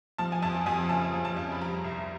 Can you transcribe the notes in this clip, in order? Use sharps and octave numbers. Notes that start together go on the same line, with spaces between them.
F3 A5
G#5
F2 A5
F2 G#5
C#3 A5
F3
A5
F2
B5
G3 A#5
C2